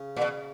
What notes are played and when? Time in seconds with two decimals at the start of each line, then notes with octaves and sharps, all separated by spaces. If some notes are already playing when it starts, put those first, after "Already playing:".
Already playing: C#3
0.16 A#2
0.21 B2